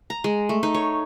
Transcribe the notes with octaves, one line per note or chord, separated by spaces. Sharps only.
A#5
G#3
A3
D#4
C#5